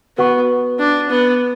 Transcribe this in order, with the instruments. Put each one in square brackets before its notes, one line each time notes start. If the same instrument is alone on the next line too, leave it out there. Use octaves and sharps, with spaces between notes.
[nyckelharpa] B3 [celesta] F#4 B4 F#5 C#6
[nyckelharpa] D4
B3